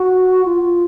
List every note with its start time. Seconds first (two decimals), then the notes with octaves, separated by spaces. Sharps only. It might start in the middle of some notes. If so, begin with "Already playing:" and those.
Already playing: F#4
0.45 F4